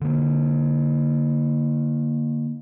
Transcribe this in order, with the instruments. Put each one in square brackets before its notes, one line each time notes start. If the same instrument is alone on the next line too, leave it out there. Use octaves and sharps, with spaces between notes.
[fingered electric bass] D3 A#3